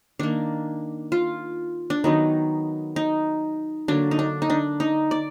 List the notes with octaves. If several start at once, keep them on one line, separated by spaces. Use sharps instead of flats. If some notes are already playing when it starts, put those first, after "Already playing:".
D#3 A#3 D4
F4
D4
D#3 F#3 B3 D#4
D#4
D3 F#3 A#3 D4
D#4
D4
D#4
D4
D#4
D5